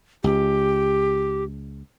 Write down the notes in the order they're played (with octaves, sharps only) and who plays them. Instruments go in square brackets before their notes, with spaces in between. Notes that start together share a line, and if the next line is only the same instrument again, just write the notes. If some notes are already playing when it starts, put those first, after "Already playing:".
[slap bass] C#2 [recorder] G4